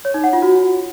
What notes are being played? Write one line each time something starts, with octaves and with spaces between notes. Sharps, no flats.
C#5
D#4
F#5
F4
F#4